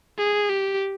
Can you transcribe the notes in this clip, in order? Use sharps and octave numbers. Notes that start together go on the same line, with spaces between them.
G#4
G4